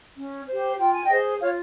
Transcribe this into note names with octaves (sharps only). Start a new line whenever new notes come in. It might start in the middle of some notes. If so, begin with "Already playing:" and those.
C#4
G4 C5
F4 G5
G#5
D#5 G5
G#4 C5
F4 C#5 F5